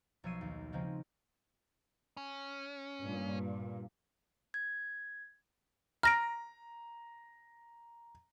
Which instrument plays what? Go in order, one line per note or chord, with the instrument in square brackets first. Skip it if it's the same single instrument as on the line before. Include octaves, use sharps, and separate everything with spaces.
[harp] B1 F3 C#5 E6 C7 D#7
D#2
C#3 F3 G#3 C4 D#4
[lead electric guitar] C#4
[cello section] G2 A#2
[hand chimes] G#6
[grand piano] A#5 [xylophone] F6 A#6 D7